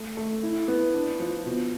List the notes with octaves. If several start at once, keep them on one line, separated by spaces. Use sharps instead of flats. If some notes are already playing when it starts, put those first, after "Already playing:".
Already playing: A3
A3
E4
B3
D4
F3
B2